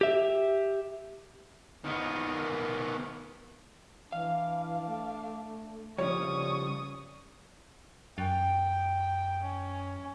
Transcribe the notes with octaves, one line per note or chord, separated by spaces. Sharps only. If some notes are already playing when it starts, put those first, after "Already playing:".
G4 E5
D#3 B3
E3 D4 F5
A3
C#3 F3 G3 C#5 D5 C#6 D#6
F#2 G5
C#4